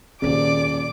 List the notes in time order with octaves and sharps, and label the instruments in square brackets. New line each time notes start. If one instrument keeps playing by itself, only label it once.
[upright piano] D#1 C#3 [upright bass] D#2 A#2 [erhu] D5 [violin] D6